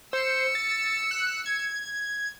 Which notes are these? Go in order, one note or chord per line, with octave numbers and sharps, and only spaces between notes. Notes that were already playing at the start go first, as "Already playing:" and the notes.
C5 E6 C#7
A6
F#6
G#6